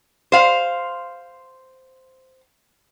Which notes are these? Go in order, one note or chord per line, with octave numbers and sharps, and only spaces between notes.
C5 F5